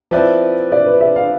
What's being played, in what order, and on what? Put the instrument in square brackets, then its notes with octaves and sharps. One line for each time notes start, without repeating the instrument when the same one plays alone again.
[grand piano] F3 C4 E4 B4 D5
[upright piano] D5
B4
E5
F5